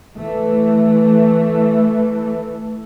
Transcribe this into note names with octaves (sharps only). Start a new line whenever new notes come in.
E3 A3